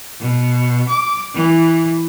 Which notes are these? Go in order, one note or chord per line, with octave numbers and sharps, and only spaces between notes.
B2
D6
E3